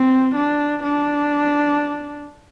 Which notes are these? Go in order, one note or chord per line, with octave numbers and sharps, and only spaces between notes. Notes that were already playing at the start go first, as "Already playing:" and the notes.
Already playing: C4
D4
D4